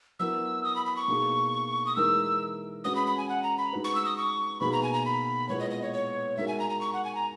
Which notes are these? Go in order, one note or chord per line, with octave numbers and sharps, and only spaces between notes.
F#3 B3 E4 A#4 E6
D#6
B5
B5
C#6
B2 A#3 D#4 G#4
D#6
E3 G#3 D#4 A#4 E6
G#3 C#4 F#4 B4 D#6
B5
B5
G#5
F#5
A#5
B5
G#3 D#4 F#4 B4
C#6
E6
D#6
C#6
B2 A#3 D#4 G#4 B4 B5
A#5
G#5
A#5
B5
A#2 G#3 B3 E4 B4 C#5
D#5
D#5
C#5
C#5
G#3 D#4 F#4 A#4 E5
G#5
A#5
A#5
C#6
F#5
G#5
A#5